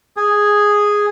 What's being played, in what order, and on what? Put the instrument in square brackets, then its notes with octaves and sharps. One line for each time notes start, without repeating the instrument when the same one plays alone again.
[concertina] G#4